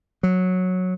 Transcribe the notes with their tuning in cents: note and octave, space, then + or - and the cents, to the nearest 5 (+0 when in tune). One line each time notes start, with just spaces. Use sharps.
F#3 -10